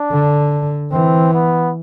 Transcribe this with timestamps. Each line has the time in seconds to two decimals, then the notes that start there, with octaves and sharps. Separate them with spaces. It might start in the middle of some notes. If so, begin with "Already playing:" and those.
Already playing: D4
0.12 D3
0.92 E3 C4
1.34 B3